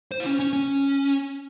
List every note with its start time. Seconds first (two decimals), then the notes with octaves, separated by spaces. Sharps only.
0.12 C5
0.20 E4
0.26 C#4
0.40 C#4
0.53 C#4